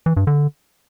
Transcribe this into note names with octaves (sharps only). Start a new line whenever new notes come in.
E3
G2
D3